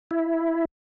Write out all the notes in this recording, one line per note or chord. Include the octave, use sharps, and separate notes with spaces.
E4